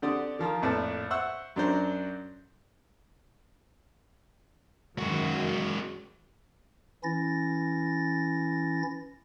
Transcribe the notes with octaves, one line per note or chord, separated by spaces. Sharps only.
D3 C4 G4 D5 F#5 D#6
D#3 F3 A#4 A#5
A#1 F2 A2 B4 D5 A5
C5 E5 F#5 C#6 E6 F#6
F#2 F#3 D4 F#4 C5 A#5
F#2 D#3 G#3 F#4
E3 C#4 E4 A6 A#6